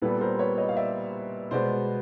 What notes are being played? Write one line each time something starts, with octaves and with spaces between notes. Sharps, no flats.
A#2 G3 B3 A4 B4
A#4 C5
B4 C#5
C#5 D#5
F5
D5 E5
B2 G#3 B3 C5 D5